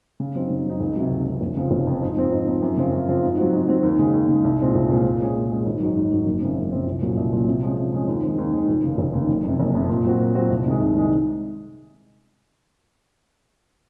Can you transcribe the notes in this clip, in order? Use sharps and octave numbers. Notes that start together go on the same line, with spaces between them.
C#3
F#3 C4 D#4
C#3
F#3 C4 D#4
C#2
C3 F#3
C#2
C3 F#3
F1
F2 C#3 F3 C4
F1
F2 C#3 F3 C4
G#2
F3 C4 D#4
G#2
F3 C4 D#4
F#2
C#3 F3 C4 F4
F#2
C#3 F3 C4 F4
G#2
F#3 C4 F#4
G#2
F#3 C4 F#4
D#2
C#3 G#3
D#2
C#3 G#3
C2
A#2 G#3 C4 F4
C2
A#2 G#3 C4 F4
A#2
G#3 C#4 G#4
A#2
G#3 C#4 G#4
G#1
G#2 F#3
G#1
G#2 F#3
F#1
F#2 C#3 F3 C4
F#1
F#2 C#3 F3 C4
C2
A#2 F#3 C#4
C2
A#2 F#3 C#4
C3
F3 G#3 C#4
C3
F3 G#3 C#4
D#2
D#3 G#3 C4
D#2
D#3 G#3 C4
F1
D#2 C#3
F1
D#2 C#3
F#1
F2 C3
F#1
F2 C3
A#2
F#3 C4 F#4
A#2
F#3 C4 F#4
C2
C3 D#3 G#3
C2
C3 D#3 G#3